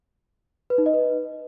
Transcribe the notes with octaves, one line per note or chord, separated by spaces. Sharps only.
B4
D#4
D#5
B4